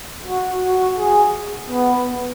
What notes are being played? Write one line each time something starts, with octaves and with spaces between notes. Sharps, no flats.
F#4
F#4
G#4
B3